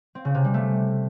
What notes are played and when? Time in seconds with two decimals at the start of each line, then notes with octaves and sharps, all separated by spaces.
0.15 C4
0.25 C#3
0.35 C3
0.44 G3
0.54 A3